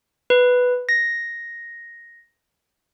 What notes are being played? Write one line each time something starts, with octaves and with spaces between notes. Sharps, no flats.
B4
A#6